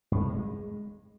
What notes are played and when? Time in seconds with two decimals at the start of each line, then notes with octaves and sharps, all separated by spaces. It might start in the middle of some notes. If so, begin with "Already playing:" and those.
0.12 G2
0.20 C3
0.29 G#3